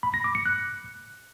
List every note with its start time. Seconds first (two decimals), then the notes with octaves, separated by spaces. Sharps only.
0.03 B5
0.14 A#6
0.24 D6
0.35 C#7
0.46 F#6